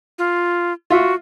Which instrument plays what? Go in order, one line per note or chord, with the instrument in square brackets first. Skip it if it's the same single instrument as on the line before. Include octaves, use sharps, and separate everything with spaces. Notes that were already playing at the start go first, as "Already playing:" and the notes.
[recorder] F4
[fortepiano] F4 E5 [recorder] F#4